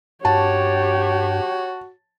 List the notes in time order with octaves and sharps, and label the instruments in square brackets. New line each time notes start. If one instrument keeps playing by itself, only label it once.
[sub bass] G2 [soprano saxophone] F#4 [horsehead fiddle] G4 C#5 [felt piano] A5